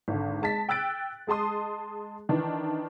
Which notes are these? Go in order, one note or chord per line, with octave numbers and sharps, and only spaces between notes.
G#1 D3
G#3 A5 A6 B6
G5 E6 F#6 A6 D7
G#3 G#4 A5 C6 D#6
D#3 E3 D4